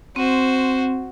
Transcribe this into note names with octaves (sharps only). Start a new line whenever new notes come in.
C4 F#4 C5